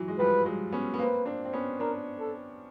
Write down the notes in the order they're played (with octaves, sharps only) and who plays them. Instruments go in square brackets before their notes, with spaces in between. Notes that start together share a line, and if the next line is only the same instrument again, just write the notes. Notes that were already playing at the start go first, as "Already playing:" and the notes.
Already playing: [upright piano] E3 F#3
G#3
[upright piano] F3 G3 [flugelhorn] B4
[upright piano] F#3 G#3
B3 C#4
B3
[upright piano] A#3 C4 [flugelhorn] B4
[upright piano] C4 D4
C4
B3 C#4
[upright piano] C4 D4 [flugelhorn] A#4
[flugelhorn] A4